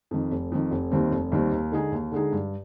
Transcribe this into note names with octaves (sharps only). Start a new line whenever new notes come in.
F2 D#3
F1
F2 D#3
F1
D#2 D#3 G3 C4
F1
D#2 D#3 G3 C4
D#2
D3 G#3 D#4 G#4
D#2
D3 G#3 D#4 G#4
G2